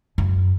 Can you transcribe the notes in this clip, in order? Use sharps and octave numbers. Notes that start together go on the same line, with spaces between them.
F#2